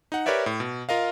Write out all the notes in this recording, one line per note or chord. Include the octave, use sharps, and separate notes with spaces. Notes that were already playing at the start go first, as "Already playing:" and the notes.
D#4 F#5
G4 A#4 B4 C#5 D5 E5
A2
B2
F4 A#4 D#5 F5